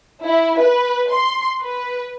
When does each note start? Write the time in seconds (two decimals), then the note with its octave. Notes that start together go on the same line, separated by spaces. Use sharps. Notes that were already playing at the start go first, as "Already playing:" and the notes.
0.24 E4
0.60 B4
1.11 C6
1.61 B4